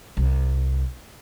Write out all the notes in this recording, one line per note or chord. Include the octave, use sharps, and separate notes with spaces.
C2